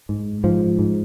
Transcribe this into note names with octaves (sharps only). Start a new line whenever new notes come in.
G#2
G#2 F3
G#2